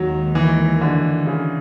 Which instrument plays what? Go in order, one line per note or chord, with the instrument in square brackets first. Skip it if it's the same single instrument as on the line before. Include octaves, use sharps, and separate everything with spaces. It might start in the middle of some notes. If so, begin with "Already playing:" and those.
Already playing: [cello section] D#2 D#3 G#3 [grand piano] F#3
[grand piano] E3
D3
C#3